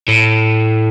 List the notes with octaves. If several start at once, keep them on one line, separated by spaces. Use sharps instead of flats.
A2